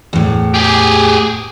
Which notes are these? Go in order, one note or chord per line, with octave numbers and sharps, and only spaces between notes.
E2 A2
G4 G#4